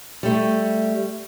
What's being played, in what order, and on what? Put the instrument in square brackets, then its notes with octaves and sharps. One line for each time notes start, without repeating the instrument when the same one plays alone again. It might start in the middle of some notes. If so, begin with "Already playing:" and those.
[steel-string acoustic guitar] G3 A3